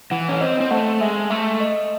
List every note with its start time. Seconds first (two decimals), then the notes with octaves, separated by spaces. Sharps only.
0.11 E3 F#5
0.29 C#4
0.41 C4 D#5
0.60 C4
0.71 A3 F#5
1.01 G#3 E5
1.30 A3 E5
1.60 D#5